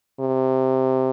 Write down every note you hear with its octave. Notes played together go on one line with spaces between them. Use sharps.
C3